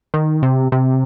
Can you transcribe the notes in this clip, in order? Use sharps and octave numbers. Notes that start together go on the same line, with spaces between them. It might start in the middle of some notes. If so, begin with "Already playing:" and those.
D#3
C3
C3